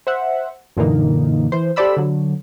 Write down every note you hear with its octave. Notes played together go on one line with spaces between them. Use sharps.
C5 E5 F#5
F#2 A#2 D3 E3 A#3 D#4
E3 C5
G4 A4 C5 D5 B5 E6
D3 F#3